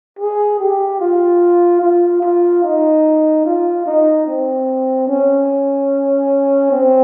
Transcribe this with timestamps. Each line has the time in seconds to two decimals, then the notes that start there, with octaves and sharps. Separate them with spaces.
0.19 G#4
0.60 G4
1.00 F4
1.82 F4
2.22 F4
2.63 D#4
3.45 F4
3.86 D#4
4.27 C4
5.08 C#4
6.72 C4